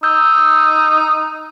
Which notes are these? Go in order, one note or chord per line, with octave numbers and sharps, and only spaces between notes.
D#4 E6 G6